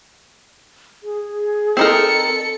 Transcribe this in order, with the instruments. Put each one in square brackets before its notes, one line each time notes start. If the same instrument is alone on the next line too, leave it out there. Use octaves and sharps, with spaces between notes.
[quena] G#4
[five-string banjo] C4 D#4 A#4 [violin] A4 C#7